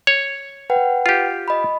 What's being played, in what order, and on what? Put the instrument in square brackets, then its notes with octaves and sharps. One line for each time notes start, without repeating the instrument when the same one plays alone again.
[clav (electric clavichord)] C#5
[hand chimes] B4 F#5 G5
[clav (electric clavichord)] F4 G4
[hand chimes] D#5 B5